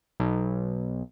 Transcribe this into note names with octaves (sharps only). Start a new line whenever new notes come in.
B1